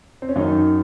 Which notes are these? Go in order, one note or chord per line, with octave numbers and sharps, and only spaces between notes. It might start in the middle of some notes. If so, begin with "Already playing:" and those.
C4
C#4
F#2 D#3 D#4